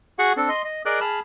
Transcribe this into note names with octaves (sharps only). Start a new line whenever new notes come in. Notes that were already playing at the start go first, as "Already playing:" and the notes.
F#4 G#4 F#5 C#6
C4 D4 A4
D#5 C6
D#5
G#4 A#4 D5 D#5 D6 F#6
G#4 A5 B5 F6